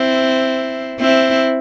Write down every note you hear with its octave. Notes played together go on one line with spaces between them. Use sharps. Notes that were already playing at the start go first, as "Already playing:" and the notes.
Already playing: C4 E4
C4 E4